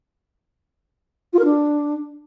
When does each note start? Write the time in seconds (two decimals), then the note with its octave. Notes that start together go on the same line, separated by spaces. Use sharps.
1.33 F4
1.39 A#4
1.45 D4